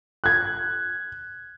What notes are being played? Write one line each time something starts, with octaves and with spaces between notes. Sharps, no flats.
F#6 G#6